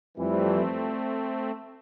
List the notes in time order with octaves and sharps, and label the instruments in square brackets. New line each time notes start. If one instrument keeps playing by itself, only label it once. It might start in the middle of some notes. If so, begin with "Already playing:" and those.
[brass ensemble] F2 E3 G3 [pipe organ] A3 C4